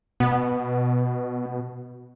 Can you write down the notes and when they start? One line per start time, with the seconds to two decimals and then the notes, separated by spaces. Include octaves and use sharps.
0.20 B2 B3